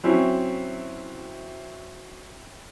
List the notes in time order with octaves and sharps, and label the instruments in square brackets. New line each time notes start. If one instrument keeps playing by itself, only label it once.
[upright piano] F#3 C4 C#4 E4